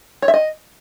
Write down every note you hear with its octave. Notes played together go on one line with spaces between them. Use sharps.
C#5
E5
D#5